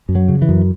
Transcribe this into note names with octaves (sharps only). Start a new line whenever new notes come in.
F#2
F#3
C#3
E3
F#2